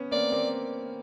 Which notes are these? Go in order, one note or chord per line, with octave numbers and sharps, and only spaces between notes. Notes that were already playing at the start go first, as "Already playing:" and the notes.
Already playing: B3 C#4
A#3 C4 D5
A#3 C4